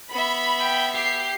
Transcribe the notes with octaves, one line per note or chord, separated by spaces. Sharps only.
B3 E5 B5
G5
G4 C7